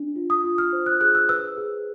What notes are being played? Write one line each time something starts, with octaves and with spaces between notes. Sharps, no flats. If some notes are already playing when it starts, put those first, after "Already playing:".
Already playing: D4
F4
D#6
F4
F6
C5
F#6
G#4 F#6
E6
B4 E6
G#4